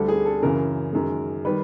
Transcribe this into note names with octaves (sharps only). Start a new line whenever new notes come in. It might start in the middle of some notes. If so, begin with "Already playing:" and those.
Already playing: D2 D3 G3 A4
G#4
A4
F#2 C#3 E3 A#4
F#2 D#3 G#3
D#3 G3 B4